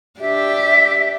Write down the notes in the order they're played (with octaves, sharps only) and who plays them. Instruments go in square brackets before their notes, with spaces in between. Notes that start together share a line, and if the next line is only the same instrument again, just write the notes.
[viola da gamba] D4 G4 [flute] E5